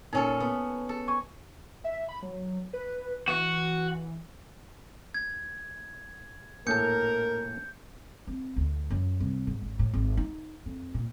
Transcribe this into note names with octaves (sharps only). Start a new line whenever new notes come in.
A#2 C#4 D#4 A4
B3
A4
G#5 C#6
E5
B5
F#3
B4
E3 F#4
G#6
A#1 A2 A4 A#4 G6 C#7
C4
D2
F#2
C2
G#2
G#1
A2
G#1
D#4
F2
A#2